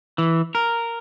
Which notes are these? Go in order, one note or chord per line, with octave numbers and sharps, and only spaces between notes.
E3
A#4